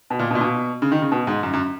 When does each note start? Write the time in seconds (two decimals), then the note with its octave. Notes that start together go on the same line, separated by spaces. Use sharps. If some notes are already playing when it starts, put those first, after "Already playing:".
0.10 B2
0.19 A#2
0.31 B2
0.35 A#2
0.41 B2
0.82 C#3
0.92 D#3
1.02 C#3
1.12 B2
1.27 G#2
1.43 F#2
1.53 F#2